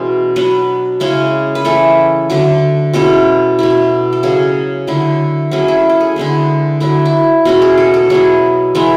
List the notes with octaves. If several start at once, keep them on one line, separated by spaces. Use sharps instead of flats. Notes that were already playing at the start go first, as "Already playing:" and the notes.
Already playing: B2 E3 G#3 C#4
F#3 B3 D4 B4
C#3 G#3 C#4 E4
B4
E3 A3 E4 A4
D3 F#3 A3
B2 G#3 C#4 E4 A4
B2 A3 E4
A4
C#3 F#3 C#4 G#4
D3 F#3 A3 E4
F#3 A3 C#4 E4 G#4
E4
A4
G#4
D3 G#3 B3 E4
D3 F#3 A3 E4
E4
B2 G#3 C#4 E4 F#4
G#4
A4
A4
F#3 B3 E4 G#4
E3 G#3 B3 E4